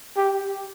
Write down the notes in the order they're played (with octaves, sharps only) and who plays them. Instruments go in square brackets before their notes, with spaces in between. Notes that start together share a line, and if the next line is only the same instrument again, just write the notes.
[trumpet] G4